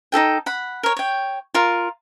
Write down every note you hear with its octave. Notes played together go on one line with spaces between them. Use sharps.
D#4 G4 A4 G5
F#5 B5
A#4 C#5
C#5 G5
F4 A#4